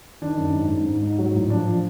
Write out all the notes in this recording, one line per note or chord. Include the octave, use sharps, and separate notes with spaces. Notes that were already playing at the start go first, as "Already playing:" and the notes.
D#3 D4
F#2
G#2
G#2
G#2
G#2
F#3
A2
F3 D4
F3